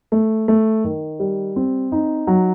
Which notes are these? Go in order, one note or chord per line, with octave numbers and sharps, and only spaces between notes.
A3
A3
D#3
G3
C4
D#4
F#3